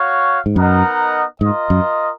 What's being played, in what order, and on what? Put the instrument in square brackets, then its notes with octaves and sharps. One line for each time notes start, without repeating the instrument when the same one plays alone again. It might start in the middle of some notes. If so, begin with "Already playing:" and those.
Already playing: [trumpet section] F#4 C#5 F5
[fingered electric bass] G#2
[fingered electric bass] F#2 [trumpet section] B3 D#4 A#4 D#5 F#5
[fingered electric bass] G#2 [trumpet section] F4 A#4 D#5
[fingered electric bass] F#2